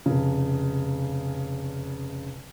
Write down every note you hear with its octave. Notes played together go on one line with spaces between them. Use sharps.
F1 C#3